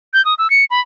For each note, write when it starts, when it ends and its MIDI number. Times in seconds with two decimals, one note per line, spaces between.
0.13 0.24 91
0.25 0.34 87
0.38 0.50 88
0.50 0.64 97
0.70 0.80 83